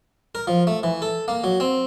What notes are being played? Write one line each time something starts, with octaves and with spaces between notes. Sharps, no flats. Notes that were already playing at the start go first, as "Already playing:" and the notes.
A#4
F3
A3
E3
A4
A#3
F#3
C4